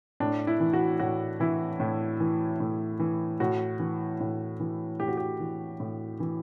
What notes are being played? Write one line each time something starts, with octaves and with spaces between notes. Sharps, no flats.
A2 D4
E4
E3
F#4
A2 F#4
E3 E4
A2
E3
A2
E3
A2 F#4
E3
A2
E3
A2 G4
F#4
G4
E3
A2
E3